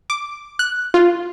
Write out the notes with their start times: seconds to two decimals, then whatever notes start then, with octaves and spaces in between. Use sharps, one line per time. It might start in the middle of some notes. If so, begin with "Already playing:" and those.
0.10 D6
0.59 F#6
0.94 F4